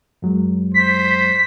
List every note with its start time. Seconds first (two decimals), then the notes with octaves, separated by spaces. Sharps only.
0.22 F#2 F#3 G#3
0.74 C5 B6